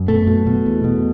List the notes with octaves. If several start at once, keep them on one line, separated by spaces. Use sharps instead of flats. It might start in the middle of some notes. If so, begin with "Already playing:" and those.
Already playing: F#2
B2 A3
B2
B2
E2
B2